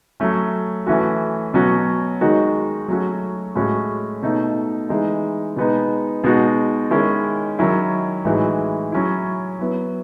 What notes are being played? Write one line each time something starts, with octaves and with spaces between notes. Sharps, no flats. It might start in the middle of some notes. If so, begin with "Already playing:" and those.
F#3 A3 C#4
E3 A3 C#4 F#4
B2 F#3 C#4 F#4
D#3 G#3 D#4 F#4
F#3 A3 C#4 F#4
A2 G#3 C#4 F#4
B2 A3 D#4
E3 G#3 D#4
B2 G#3 B3 D#4
B2 G#3 D#4 F#4
D#3 G#3 C#4 E4
D#3 F#3 C#4 E4
A2 E3 G#3 D#4 F#4
F#3 C#4 E4
F#3 B3 E4